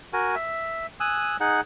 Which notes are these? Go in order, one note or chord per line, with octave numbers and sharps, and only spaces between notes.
F#4 A#4 G#5
E5
G#5 D#6 E6 F#6
D#4 G#4 F#5